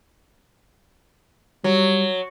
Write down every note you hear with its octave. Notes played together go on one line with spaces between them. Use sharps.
F#3 G3